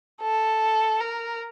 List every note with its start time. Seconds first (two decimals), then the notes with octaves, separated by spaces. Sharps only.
0.21 A4
1.00 A#4